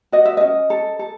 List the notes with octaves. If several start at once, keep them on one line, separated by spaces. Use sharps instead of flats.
F#4 D#5
E5
C#4 D#5
A4
A4